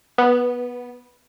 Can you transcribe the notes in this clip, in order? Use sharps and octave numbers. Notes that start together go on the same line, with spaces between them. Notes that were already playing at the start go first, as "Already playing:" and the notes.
B3